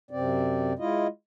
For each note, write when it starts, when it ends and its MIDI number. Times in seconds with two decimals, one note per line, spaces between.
0.11 0.73 42
0.11 0.73 48
0.11 0.73 60
0.11 0.73 74
0.79 1.07 56
0.79 1.07 64
0.79 1.07 65
0.79 1.07 75